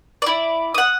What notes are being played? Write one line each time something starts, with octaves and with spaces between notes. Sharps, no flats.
E4 D5
F#5 D#6